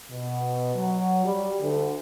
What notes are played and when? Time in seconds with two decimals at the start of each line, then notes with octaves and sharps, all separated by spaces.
0.11 B2
0.75 F#3
1.25 G3
1.61 D2